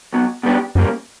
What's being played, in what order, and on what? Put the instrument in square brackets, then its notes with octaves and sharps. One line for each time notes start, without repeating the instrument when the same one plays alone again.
[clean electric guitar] B1 B2 F#3
B2 G3 B3 D4 G4
[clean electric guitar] C#2 C#3 G3 A#3 [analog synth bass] F#2